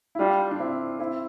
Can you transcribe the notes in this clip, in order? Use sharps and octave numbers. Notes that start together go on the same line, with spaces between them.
E4
G3 D4 F4
D4
C4 E4
C4 E4